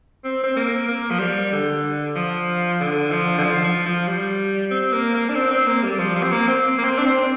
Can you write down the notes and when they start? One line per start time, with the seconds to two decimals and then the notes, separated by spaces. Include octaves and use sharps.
0.25 C4
0.44 C4
0.57 A#3
0.89 A#3
1.11 F3
1.19 G3
1.53 D3
2.16 F3
2.80 D3
3.12 F3
3.38 D3
3.44 F3
3.64 F3
3.86 F3
4.08 G3
4.71 C4
4.93 A#3
5.15 A#3
5.29 D4
5.36 C4
5.51 C4
5.67 A#3
5.83 G3
5.99 F3
6.16 F3
6.23 C4
6.32 A#3
6.48 C4
6.78 A#3
6.84 C4
6.99 D4
7.06 C4